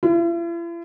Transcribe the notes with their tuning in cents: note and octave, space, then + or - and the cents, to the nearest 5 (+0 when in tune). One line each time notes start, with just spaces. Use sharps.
E4 +45